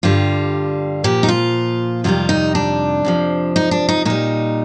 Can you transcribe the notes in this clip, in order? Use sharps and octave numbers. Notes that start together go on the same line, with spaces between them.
G2 D3 G3 F4
A#2 F3 G4
D#4
F4
F2 C3 D#3 G3 F4
D#4
D4
F2 C3 F3
D#4
D4
D#4
A#2 G3 D#4